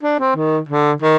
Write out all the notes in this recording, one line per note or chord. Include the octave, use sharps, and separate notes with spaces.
D4
C4
D#3
D3
D#3